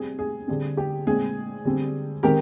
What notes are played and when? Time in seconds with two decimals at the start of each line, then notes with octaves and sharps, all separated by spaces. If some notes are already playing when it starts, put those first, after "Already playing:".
Already playing: C3 G3 C4 G#4
0.19 G#4
0.48 D3 G3 C4 G#4
0.77 G4
1.06 A#2 G#3 C4 G#4
1.65 D3 G3 C4
2.23 D#3 G#3 C4 G4 A#4